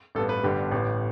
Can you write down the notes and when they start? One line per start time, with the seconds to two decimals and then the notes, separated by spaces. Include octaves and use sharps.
0.15 A1 G2 G3 B3 A4
0.29 B4
0.43 G1 G2 D3 B3 G4
0.72 A1 A2 G3 B3